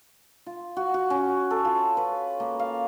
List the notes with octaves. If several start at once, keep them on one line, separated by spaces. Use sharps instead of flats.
F4
F#4
F#4
C#4
A4
F4
B4
A#3
F5